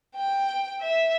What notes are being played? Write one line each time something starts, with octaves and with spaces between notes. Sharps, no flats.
G5
E5